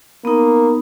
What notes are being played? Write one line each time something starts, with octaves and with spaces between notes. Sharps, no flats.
A#3 B3 D#4